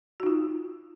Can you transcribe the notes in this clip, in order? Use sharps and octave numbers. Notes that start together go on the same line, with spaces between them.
D#4 F4 F#4